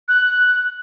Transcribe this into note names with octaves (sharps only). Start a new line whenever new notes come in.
F#6